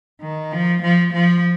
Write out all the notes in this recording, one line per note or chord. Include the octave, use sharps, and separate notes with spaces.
D#3
F3
F3
F3